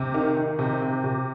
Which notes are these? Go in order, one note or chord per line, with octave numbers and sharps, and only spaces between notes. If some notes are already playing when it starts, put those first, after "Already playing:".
Already playing: C3
D#3
D#3
C3
C3
C3